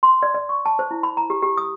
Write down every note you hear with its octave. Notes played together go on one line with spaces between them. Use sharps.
C6
D5
D5
C#6
A5
C5
E4
B5
A#5
G4
G4
D#6